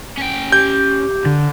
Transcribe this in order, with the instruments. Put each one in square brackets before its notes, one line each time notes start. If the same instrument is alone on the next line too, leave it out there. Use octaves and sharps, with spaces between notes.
[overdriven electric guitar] C#4 G5
[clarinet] G4 [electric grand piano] G6
[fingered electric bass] D3